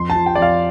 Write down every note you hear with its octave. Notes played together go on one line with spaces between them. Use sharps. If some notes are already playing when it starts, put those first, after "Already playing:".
Already playing: F2 C6
A5
F3
G5
F2 D5
F5